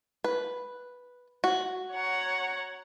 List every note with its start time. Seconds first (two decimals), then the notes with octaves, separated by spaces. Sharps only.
0.24 B4
1.44 F#4
1.92 C#5 F#5 A#5